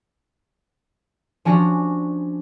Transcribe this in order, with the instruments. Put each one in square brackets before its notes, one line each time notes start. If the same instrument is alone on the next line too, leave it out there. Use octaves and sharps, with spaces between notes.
[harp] F3 C#4 D4 F#4